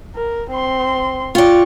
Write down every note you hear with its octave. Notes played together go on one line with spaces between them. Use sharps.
A#4
C4 C6
F4 D5 G5 C#6